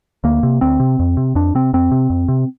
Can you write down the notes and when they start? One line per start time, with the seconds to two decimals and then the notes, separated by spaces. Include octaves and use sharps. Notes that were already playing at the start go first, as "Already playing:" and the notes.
0.24 D2 A#3
0.43 C3
0.61 D2 C4
0.80 C3
0.99 F2
1.17 C3
1.35 F2 D4
1.55 C3 C4
1.73 F2 C4
1.91 C3
2.10 F2
2.28 C3